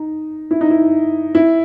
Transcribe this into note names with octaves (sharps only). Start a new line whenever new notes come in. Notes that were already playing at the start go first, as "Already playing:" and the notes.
Already playing: D#4
E4
D#4
E4
E4